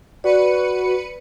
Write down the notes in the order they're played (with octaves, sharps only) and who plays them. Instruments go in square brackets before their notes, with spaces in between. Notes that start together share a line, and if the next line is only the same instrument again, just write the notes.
[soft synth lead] F#4 [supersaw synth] B4 C#7 D#7 [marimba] D5